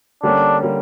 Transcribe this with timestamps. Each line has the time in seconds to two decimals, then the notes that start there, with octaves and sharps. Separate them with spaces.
0.23 D3 G3 A#3 C#4 D4
0.61 D3 G3 A#3 C#4